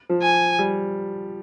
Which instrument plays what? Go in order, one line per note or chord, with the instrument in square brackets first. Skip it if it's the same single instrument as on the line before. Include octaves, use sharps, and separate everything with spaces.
[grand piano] F3
[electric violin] G#5
[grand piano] G3